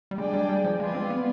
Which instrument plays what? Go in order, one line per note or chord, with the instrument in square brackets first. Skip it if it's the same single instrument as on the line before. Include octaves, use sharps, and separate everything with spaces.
[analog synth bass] G3
[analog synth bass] G#3 [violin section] D4 G#4 D5 G5
[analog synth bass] G3
G3
F3
[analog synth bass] G#3 [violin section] F4 B4 D5 G#5
[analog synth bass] C4
B3